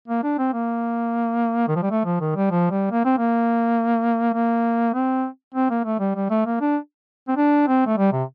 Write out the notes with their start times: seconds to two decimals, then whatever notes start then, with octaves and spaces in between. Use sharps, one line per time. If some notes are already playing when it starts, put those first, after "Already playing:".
0.08 A#3
0.24 D4
0.39 C4
0.54 A#3
1.68 D#3
1.76 F3
1.83 G3
1.91 A3
2.06 F3
2.21 D#3
2.36 G3
2.51 F3
2.71 G3
2.92 A#3
3.05 C4
3.18 A#3
4.34 A#3
4.94 C4
5.55 C4
5.70 A#3
5.85 A3
6.00 G3
6.16 G3
6.30 A3
6.46 A#3
6.61 D4
7.28 C4
7.37 D4
7.67 C4
7.87 A3
7.97 G3
8.13 C3